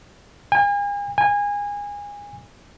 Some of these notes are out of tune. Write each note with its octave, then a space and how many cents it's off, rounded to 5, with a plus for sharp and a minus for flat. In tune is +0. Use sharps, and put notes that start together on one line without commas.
G#5 -40
G#5 -25